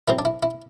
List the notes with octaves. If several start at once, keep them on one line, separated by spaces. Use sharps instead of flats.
A2 F#3 C4 E4
D4
E4
E4